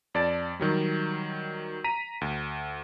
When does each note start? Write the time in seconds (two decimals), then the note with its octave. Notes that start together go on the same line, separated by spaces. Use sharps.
0.14 F2 D5 A5 A6
0.60 D#3 F#3 G3
1.84 A#5 B6 D#7
2.21 D2